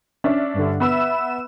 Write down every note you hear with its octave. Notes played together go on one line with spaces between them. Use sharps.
C#4 D4 E5
G2 D3
B3 E5 B5 E6 E7